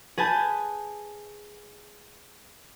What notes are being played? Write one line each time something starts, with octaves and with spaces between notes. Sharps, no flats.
G#4 B4 G#5 A5 G6